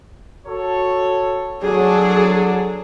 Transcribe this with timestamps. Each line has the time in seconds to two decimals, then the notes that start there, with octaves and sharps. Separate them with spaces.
0.47 F#4 A4 C#5
1.63 F#3 D4 G#4 A4